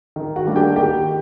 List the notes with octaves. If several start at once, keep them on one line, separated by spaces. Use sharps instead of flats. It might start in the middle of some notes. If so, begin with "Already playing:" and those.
D#3
F#4 F#5
G3 A#3 D4
G4 G5
D#3 G4 G5